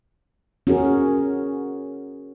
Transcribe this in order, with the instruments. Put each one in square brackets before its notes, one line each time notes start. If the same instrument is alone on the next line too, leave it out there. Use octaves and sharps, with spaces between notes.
[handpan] C#4 F#4 G#4 A#4